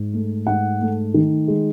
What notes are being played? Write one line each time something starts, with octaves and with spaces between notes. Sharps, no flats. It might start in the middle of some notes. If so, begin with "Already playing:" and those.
Already playing: G#2
A3
G#2 F#5
A3
D#3
G#3